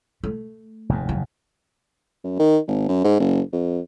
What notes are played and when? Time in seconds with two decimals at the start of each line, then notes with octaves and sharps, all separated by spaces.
0.24 A3
0.89 F1 D#2 G#2
1.09 D#3 F#3
2.24 F#2
2.39 D#3
2.68 G#1
2.89 F#2
3.04 G#2
3.20 F#1
3.52 F2